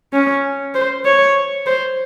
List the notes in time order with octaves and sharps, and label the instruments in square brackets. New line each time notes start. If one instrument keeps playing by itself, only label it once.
[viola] C#4
C5
C#5
C5